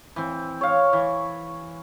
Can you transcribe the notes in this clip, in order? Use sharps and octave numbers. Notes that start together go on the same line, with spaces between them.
E3 C4
C#5 F5
E3